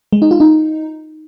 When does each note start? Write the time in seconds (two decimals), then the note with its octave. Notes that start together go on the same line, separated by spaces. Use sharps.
0.13 G#3
0.22 D#4
0.31 F4
0.40 D#4